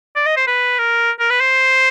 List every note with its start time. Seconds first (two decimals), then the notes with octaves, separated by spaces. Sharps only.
0.16 D5
0.26 D#5
0.37 C5
0.47 B4
0.78 A#4
1.20 A#4
1.30 B4
1.41 C5